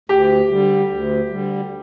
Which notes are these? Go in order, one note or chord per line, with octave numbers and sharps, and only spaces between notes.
D2 G4
D3 G3
D2
D3 G3